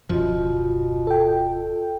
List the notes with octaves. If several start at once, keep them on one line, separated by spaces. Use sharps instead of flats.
D1 F#2 B2 F3 F4
A4 G5